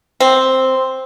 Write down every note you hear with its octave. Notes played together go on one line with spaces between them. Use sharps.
C4